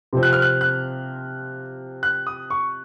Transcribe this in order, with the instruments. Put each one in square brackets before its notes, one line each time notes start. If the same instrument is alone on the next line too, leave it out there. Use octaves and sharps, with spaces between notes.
[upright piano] C3 F3 C4
[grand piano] F#6
F6
F#6
F#6
F#6
D#6
C#6